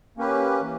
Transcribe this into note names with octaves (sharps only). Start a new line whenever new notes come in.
A#3 C#4 G4 B4
E3